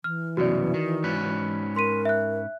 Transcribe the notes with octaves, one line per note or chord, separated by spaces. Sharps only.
E3 F6
C2 F#2 B2 F#4 D5
D#3
G#2 C#4 B4
A#4 C6 B6 D#7
E5 F#6